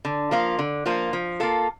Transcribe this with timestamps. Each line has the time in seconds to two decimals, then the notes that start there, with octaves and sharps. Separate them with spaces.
0.05 D3
0.31 F3 A#3 F4
0.59 D3
0.86 F3 A#3 F4
1.13 F3
1.40 A#3 F4 A4